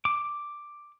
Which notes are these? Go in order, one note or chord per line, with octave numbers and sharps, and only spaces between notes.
D6